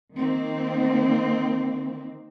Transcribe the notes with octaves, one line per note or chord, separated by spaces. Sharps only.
D#3 A#3 C4